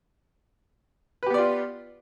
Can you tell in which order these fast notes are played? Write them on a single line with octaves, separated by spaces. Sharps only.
B4 G4 B3 D5 F4